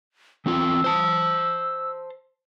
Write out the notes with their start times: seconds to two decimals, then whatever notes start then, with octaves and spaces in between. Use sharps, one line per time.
0.46 E3 C4 F4 E6
0.84 C5 A5